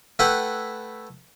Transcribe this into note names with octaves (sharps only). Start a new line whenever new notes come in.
A3 E4 B4 F#5 G5